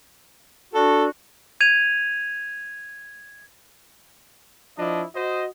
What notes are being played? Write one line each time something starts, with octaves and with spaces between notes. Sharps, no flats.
D4 F#4 A4
G#6 D#7 F7
F3 D4 E4 D#5
F#4 C5 D#5